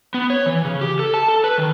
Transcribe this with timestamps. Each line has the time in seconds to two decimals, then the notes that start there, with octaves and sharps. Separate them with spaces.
0.14 B3
0.30 C#5
0.46 E3
0.65 C#3
0.81 G4
0.99 A4
1.14 A5
1.28 A4
1.44 B4
1.58 D#3